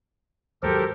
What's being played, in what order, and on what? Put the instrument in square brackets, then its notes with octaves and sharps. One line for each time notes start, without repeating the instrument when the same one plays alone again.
[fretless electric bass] D#2 G#2 F#3 [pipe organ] G4 A4 A#4 [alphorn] C5